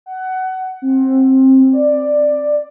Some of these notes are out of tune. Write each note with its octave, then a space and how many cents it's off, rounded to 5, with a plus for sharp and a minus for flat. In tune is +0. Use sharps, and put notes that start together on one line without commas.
F#5 +20
C4 +20
D5 +10